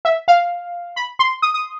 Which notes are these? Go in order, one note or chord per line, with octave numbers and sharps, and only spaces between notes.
E5
F5
B5
C6
D#6
D#6